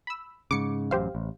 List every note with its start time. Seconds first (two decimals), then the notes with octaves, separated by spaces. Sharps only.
0.07 B5 E6
0.51 G#2 C#3 D6 C#7
0.91 A1 F#2 G4 C5 F5
1.15 A1